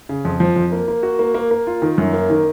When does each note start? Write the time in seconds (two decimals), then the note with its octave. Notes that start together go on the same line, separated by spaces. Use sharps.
0.09 C#3
0.25 F2
0.40 F3
0.56 F2
0.72 A#3
0.88 A#3
1.03 F#4
1.19 A#3
1.34 A#3
1.51 A#3
1.67 F4
1.82 D#3
1.98 F#2
2.13 A#3
2.30 D#3